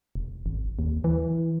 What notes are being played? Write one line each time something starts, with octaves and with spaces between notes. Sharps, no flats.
E1
G#1
D#2
E3